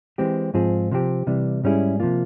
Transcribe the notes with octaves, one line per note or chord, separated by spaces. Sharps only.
E3 G#3 C4 G4
G#2 F3 C4 F4 G#4
C3 F3 C4 G4
C3 E3 G3
G#2 G3 C#4 E4 G#4
C3 F3 A#3 F4